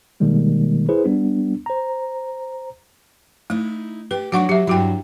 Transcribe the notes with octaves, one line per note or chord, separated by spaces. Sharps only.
B2 D#3 G3 G#3 A#3
E4 G#4 B4 C5
G3 B3 D4
C5 A#5
A3 D#4 E4
G4 B4
F#3 D4 D#4 F#4 F#5 C#6
F#3 G4 E5
G2 F#3 E4 F#4 G5